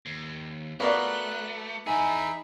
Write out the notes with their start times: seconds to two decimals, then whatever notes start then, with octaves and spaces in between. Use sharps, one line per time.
0.06 D#2
0.80 A3 B3 F#4 A#4 C#5 D5 F5 F#6
1.87 E3 D#4 G#4 E5 G#5 B5